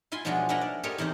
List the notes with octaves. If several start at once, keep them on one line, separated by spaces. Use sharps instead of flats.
E4 F4 G#5 C6
B2 F3 F#3 G#3 D4 F#4
D4 E4 A#4 D#5 F#5
D5
G4 A4 A#4 C5 C#5 D#5
E2 C3 D#4 C5